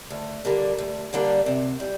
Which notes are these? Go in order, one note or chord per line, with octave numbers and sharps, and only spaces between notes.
D2
D3 G3 A#3 D4
D2
D3 G3 A#3 D4
C3
G3